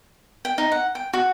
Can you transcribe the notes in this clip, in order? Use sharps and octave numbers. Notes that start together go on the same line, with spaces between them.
G5
D#4
F#5
G5
F#4